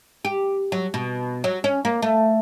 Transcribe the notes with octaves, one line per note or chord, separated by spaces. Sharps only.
G4
F#3
B2
F#3
C#4
A#3
A3